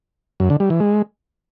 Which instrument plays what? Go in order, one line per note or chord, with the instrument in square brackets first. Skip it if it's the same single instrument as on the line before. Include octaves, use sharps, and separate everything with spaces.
[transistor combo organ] F#2
D3
G3
E3
G#3